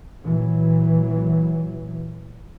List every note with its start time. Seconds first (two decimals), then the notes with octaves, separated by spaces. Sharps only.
0.24 A#2 E3 F#3